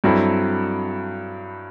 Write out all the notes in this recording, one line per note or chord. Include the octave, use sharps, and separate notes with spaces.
G2 F#3 C4 E4 A4